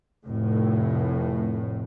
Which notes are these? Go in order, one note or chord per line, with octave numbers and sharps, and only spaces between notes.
F1 A2